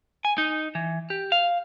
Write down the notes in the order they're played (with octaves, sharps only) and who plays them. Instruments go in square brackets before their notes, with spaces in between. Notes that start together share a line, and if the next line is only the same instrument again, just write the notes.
[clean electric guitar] G#5
D#4
E3
G4
F5